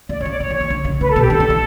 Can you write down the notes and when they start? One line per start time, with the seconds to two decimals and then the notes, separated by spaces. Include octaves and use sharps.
0.09 C#3 D5
0.20 B2 C#5
0.25 C#3
0.30 D5
0.40 C#3 C#5
0.50 D3
0.55 C#5
0.61 E3
0.70 D3
0.85 C#3
1.01 C#3 B4
1.10 A4
1.16 B2
1.21 G4
1.30 D3 A4
1.40 D3
1.50 E3